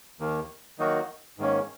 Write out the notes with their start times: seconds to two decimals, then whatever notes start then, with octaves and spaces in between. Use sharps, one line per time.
0.19 D#2 D#3 A#3
0.79 D#3 F#3 A#3 D#4 F#4
1.38 G#2 D#3 A#3 C#4